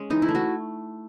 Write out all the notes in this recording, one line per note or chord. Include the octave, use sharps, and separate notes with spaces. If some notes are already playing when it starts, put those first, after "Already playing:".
Already playing: G#3 C#4
E3 D#4
E4
A3
F#4